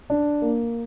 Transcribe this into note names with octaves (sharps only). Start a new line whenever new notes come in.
D4
A#3